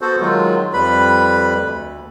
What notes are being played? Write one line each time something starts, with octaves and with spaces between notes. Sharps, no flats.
B3 F#4 A4 C5
D#3 F#3 G#3 F4
F2 G3 B4 B5
D2